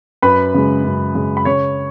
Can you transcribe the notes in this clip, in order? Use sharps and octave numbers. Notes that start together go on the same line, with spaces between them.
F#2 B4 B5
C#3 G#3
F#2
C#3 G#3
B5
C#3 C#5 C#6